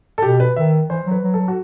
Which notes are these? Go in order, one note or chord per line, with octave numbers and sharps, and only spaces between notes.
A4
B2 G4
B4
D#3 E5
E3 C5
F#3
B4
F#3
A4
F#3
F#4